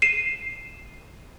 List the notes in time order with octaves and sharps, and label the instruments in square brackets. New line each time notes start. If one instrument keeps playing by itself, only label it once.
[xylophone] C7 D#7 E7